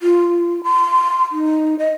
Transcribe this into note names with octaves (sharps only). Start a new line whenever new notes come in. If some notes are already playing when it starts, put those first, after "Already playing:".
F4
C6
D#4
D#5